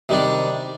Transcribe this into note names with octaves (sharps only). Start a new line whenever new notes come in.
C3 D#3 G3 D4